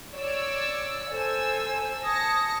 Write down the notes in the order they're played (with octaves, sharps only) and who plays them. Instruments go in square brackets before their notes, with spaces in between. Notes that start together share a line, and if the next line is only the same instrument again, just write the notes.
[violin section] C#5 D5 E6
[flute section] A4 C5 [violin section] G#5 E6
[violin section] A5 A#6 C#7 [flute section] D#6 G#6